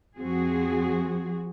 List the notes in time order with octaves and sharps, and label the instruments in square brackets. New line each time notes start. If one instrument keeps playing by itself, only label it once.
[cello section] F2 F3 C4 F#4 G#4